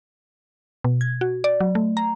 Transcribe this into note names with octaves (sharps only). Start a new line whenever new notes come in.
B2
G#6
F#4
D5
F#3
A3
A#5